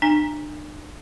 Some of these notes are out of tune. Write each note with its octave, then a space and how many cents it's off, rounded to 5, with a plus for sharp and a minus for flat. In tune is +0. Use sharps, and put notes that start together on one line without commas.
D4 +40 G#5 -35